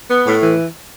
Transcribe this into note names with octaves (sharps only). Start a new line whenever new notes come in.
B3
A2
E3